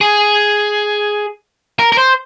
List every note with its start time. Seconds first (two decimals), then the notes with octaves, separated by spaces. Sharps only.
0.01 G#4
1.79 A#4
1.92 A#4
1.98 C5